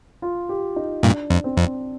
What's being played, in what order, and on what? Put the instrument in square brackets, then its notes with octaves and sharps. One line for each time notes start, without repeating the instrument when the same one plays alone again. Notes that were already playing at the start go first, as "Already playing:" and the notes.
[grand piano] F4
G4
D#4
[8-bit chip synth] G2 A#2 [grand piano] D4
[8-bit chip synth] F2
[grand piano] C4
[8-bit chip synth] F2